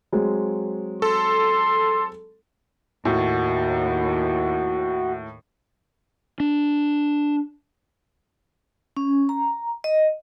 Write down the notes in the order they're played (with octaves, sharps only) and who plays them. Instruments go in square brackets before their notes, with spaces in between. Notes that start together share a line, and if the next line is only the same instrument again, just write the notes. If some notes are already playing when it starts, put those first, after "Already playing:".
[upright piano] F#3 G#3 C4
[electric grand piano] A4 [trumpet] C6
[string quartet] D#2 [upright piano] A2 [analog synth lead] F#4
[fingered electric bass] D4
[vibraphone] C#4
A#5
D#5